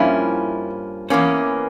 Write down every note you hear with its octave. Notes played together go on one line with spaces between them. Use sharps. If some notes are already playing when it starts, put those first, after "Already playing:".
Already playing: G2 F3 A#3 C#4 E4
E2 E3 A#3 C#4